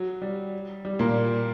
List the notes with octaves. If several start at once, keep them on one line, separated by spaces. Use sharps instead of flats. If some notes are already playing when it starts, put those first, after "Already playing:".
Already playing: F#3
G3
G3
A#2 A#3